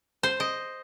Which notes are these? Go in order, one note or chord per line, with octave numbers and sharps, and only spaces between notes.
C5
D#5